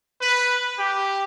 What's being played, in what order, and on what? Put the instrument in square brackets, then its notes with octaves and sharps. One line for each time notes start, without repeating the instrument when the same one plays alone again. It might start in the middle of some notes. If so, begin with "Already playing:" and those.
[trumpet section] B4
G4